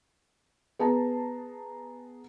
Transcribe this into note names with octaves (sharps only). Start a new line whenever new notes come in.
B3 G#4 A5 A#5